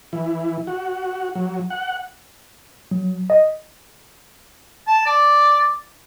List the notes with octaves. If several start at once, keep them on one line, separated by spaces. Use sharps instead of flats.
E3
F#4
F#3
F#5
F#3
D#5
A5
D5